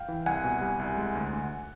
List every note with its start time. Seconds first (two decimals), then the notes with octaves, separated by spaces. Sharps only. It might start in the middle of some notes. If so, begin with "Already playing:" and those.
Already playing: F5 G5
0.08 E3
0.26 C2 F#5 G#5
0.44 B2
0.61 G3
0.80 C2
0.97 G#3
1.15 D2
1.33 D2